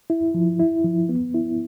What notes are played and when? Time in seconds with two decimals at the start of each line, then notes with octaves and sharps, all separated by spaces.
0.10 E4
0.34 F3
0.60 E4
0.84 F3
1.09 B3
1.34 E4